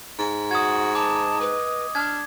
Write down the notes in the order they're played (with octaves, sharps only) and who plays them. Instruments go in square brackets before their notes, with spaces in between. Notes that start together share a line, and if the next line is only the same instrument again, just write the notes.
[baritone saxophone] G#2
[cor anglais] F#4 [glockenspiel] D#6 G#6
[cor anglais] D#5 [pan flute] A5 [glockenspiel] D6
[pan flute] B4
[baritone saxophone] D4 [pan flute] F6 [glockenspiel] G#6